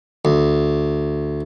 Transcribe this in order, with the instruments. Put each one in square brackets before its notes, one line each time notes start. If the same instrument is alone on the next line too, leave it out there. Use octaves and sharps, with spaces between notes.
[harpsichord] D2